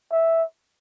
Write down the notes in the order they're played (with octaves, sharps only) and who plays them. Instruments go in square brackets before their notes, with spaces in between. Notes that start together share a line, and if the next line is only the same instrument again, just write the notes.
[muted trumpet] E5